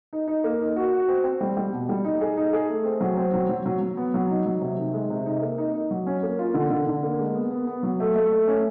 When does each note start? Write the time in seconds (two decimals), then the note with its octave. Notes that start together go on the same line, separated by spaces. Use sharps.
0.13 D#4
0.27 D#4
0.44 A#3
0.61 D#4
0.76 F#4
0.93 F#4
1.08 C4
1.24 C4
1.41 G3
1.57 G3
1.72 B2
1.89 G3
2.04 D#4
2.21 G#4
2.37 D#4
2.53 G#4
2.70 A3
2.85 C4
3.01 F#3
3.17 C4
3.34 F#3
3.49 F#3
3.66 F#3
3.81 F#3
3.97 B3
4.14 F#3
4.30 D#4
4.46 F#3
4.61 C3
4.78 D#3
4.94 G#3
5.10 C3
5.26 D#4
5.42 A#3
5.58 D#4
5.74 D#4
5.91 F#3
6.07 C#4
6.23 A#3
6.39 F4
6.54 D3
6.70 D3
6.87 D3
7.03 A#3
7.19 G#3
7.35 B3
7.51 B3
7.67 B3
7.83 F#3
8.00 A3
8.16 A3
8.32 A3
8.48 C#4